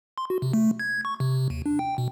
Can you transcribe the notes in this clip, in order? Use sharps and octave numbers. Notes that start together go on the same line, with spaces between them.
C6
F#4
C3
A3
G#6
C#6
C3
D#2
D4
G5
B2